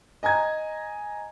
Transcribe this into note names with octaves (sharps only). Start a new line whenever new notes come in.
D#5 G#5 A#5 G#6